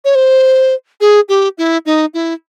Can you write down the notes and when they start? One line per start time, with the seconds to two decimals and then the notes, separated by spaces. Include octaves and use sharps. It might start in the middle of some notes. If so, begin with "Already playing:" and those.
0.05 C#5
0.15 C5
1.01 G#4
1.29 G4
1.58 E4
1.86 D#4
2.14 E4